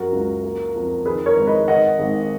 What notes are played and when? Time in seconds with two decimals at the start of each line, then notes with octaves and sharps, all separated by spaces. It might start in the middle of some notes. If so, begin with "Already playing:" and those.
Already playing: F#2 F#3 F#4 A#4
0.12 C#2
0.44 A#3
0.75 F2
1.05 D#3 G#4 B4
1.26 A#4 C#5
1.37 G#1
1.47 B4 D#5
1.68 D#3 D#5 F#5
1.99 G#1